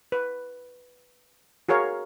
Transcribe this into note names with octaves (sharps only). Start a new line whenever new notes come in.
B4
F#4 G#4 A#4 C#5 F5